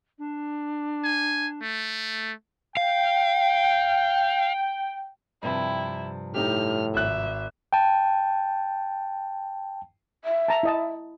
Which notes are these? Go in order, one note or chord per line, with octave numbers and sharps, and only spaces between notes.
D4
G#5
A3
F5 G5
G2 C3 F3 E4
A2 D#4 G4 F6
G#1 E5 F#6
G5 A5
E5
A5 A#5
E4 D#5 A5